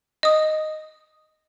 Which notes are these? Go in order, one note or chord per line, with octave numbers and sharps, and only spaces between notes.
D#5 D#6